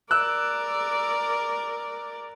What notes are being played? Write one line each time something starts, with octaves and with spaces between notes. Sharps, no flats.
A#4 D5 E6 F#6